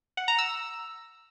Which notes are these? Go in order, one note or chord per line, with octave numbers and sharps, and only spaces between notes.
F#5
A#5
E6